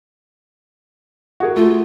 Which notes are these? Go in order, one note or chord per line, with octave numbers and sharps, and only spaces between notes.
F#4 G#4 A#4
A3 F4